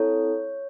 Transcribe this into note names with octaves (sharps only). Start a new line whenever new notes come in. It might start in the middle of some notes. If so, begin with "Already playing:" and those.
Already playing: C4 E4 A4 C#5